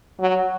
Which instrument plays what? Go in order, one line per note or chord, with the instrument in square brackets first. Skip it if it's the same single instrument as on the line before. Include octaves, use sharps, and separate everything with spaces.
[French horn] F#3